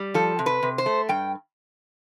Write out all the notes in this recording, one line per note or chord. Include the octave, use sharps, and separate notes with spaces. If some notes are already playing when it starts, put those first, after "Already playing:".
Already playing: G3
F3 A4
C3
B4
C3
C5
A3
G2 G5